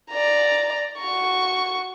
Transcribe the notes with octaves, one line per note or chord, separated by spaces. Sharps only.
D5 A#5
F#4 C#6